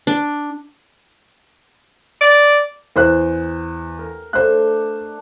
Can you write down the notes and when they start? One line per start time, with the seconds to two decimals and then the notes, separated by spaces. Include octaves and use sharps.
0.07 D4
2.21 D5
2.96 E2 C5 F#6
3.99 A#4
4.33 A3 D4 C5 F#6